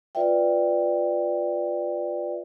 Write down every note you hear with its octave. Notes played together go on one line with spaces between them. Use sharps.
F4 B4 D5 E5 G5